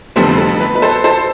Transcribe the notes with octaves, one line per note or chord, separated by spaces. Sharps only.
F1 F2 D3 G3 B3 A4 C5
A4
B4
B4
A4 C5
A4 C5